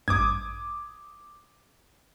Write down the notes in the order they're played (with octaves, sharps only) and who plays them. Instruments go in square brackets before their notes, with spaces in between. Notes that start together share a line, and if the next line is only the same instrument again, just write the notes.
[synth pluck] A1 G2 [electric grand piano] D6 D#6 G#6